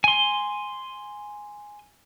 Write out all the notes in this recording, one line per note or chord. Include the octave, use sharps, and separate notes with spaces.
G#5 C6